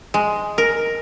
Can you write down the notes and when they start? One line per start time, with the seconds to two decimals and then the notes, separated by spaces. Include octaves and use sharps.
0.14 G#3
0.58 A#4